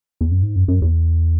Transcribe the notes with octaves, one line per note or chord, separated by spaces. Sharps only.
E2
F#2
G#2
F#2
F#2
E2